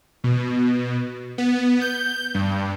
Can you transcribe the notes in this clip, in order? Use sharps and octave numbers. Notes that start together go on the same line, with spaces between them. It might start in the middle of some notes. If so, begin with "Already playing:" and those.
B2
B3
G6
G2